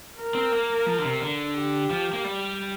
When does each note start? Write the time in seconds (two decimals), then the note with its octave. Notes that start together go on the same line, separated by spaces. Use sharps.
0.18 A#4
0.35 C4
0.52 A#3
0.86 F3
0.98 D3
1.05 C3
1.21 D3
1.56 G4
1.90 F3
2.13 A#3
2.25 G3